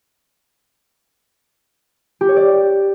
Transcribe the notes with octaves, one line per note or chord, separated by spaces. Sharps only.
G4
C#5
D5